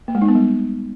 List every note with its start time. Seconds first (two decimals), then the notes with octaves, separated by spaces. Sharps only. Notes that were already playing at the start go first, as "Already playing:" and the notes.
0.08 A#3
0.15 G#3
0.22 D#4
0.28 B3
0.35 G3